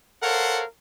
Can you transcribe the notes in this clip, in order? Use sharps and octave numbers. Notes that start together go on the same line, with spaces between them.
A4 A#4 C5 C#5 F5 F#5